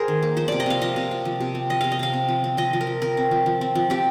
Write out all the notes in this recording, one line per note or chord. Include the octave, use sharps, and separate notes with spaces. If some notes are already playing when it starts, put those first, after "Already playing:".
Already playing: G#4 A#4 C5
D#3
A#3
F3 C5
C3 D5
D#5
C3 F5
F3 D#5
C3
C3
F3
C3
C4
F3 D#5
C3 F5
D#5
C3 F5
C4
F3
C4
F3 D#5
F3
A#4
F3
C4 A#4
C4
F3
F3
C4
F3
C4 G4